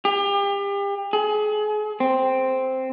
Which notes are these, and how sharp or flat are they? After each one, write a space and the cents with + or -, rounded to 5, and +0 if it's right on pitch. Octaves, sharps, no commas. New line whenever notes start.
G4 +35
G#4 +35
C4 +0